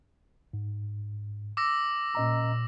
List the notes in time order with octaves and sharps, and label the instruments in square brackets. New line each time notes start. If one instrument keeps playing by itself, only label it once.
[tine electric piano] G#2
[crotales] D6 E6 A#6
[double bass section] A#2 [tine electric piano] C#4 D#5 A#5